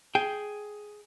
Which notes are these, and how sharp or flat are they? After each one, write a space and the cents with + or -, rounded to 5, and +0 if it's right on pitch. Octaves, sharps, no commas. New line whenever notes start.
G#4 +5 G5 +0